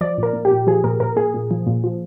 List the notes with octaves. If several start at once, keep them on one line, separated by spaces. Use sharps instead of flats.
F3 D5
A#2 A#4
A#2
G4
A#2
F3 G#4
A#2 A#4
A#2 A#4
A#2 G#4
A#2
F3
A#2
F3